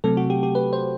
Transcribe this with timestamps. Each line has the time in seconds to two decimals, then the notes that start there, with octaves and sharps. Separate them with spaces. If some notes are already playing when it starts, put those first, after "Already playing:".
0.04 C3 F#3 A3 C4 A4
0.17 F#4
0.30 G4
0.43 G4
0.55 B4
0.73 C5